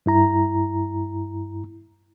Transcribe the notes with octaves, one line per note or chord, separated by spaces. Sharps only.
G2 E4 A#5